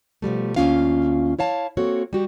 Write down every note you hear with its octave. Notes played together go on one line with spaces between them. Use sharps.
B2 F3 G3 A3
D2 A#3 C#4 F4 F5
E4 C#5 F5 A5
A#3 C4 F#4 A4 C#5
G3 F#4 G4